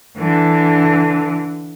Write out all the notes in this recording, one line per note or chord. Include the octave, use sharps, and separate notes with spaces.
D3 E3